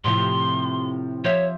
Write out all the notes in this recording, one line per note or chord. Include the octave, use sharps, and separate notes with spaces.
A2 C3 F3 C6
F3 C#5 E5